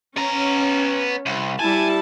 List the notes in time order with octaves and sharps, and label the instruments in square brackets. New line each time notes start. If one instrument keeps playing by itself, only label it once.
[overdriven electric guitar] B3 A#5 [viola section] C#4
[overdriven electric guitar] C2
[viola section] G3 E4 A5 [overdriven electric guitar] G#5